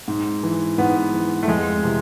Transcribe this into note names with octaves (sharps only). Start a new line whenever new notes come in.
G#2
E3
G#2 B3
E3
A3
F2 G#3
C3 E3